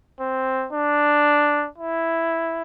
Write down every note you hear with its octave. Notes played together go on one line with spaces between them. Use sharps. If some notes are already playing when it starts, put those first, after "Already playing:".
C4
D4
E4